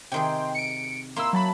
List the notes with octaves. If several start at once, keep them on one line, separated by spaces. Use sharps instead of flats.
C3 D#3 G#4 G5 C6
C#7 D7
A#3 E4 C6 E6
F#3 A5 B5